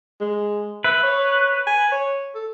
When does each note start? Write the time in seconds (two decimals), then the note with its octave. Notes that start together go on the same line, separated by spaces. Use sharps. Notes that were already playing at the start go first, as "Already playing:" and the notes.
0.21 G#3
0.84 B4 E5
1.03 C#5
1.67 G#5
1.92 C#5
2.35 A4